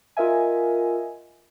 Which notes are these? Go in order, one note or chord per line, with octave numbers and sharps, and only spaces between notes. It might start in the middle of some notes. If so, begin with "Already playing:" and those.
F4 A#4 D#5 E5 G#5